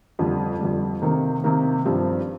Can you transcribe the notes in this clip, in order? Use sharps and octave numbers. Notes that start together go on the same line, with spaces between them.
F2 D3 G3
F2 D3 G3
C3 D#3 A#3
C3 D#3 A#3
G2 F3 C4 G4